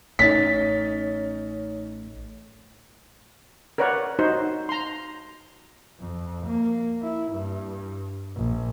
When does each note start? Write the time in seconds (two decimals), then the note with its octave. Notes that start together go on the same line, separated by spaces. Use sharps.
0.19 A1 A3 C#4 D#4 A6 B6
3.78 A#4 B4 C#5 D5 F#5
4.19 D#4 F#4 C5
4.69 A#5 C6
6.00 F2
6.46 A#3
7.02 E4
7.31 G2
8.35 A#1